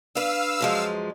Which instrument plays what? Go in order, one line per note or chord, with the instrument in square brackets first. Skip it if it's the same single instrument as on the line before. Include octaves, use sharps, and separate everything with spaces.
[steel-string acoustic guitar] D4 B4 [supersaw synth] F5 E6
[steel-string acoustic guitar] F#2 F3 G#3